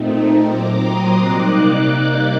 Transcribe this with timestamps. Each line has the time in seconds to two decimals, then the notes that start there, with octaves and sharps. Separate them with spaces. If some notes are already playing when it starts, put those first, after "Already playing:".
Already playing: A#2 A3 C4 D#4
0.45 A#2 F#3 C4 A#5 D6
0.82 C6 D#6
1.19 C3 G3 A#3 D#4 D6 F#6